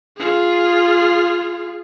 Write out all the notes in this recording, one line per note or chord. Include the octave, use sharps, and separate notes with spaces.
F4 G#4